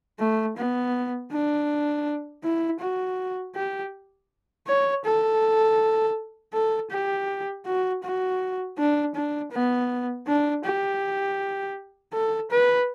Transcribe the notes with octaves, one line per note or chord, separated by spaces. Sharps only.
A3
B3
D4
E4
F#4
G4
C#5
A4
A4
G4
F#4
F#4
D4
D4
B3
D4
G4
A4
B4